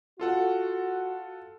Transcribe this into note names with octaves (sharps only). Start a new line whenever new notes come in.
F4 F#4 A4 F#5